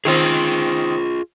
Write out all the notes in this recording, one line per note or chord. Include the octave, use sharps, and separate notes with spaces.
D#3 C4 F4 G#4